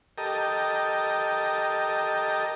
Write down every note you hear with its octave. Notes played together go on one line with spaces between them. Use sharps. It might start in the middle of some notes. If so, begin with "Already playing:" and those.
G4 A4 A#4 D#5